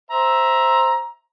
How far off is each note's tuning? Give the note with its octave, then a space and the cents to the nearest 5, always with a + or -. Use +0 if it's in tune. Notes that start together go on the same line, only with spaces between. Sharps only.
C5 +0 E5 +0 A#5 +15